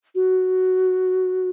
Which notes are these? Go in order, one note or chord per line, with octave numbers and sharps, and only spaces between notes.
F#4